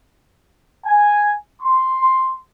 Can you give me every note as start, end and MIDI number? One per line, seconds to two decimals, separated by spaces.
0.86 1.32 80
1.62 2.35 84